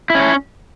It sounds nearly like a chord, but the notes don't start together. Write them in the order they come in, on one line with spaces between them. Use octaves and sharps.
E4 C#4 C#5